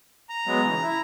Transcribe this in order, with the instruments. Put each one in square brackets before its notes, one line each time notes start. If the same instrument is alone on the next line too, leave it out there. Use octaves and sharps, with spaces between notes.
[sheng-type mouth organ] A#5
[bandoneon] F#3 G#3 B3
C#3 E3
E4